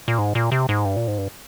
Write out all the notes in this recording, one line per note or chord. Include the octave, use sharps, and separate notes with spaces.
A#2
G#2
A#2
C3
G#2
G2
A#2
G#2
G2